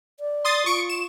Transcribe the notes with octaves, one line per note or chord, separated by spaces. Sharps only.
D5
C6 D#6 A6
F4 C#6 D7
E7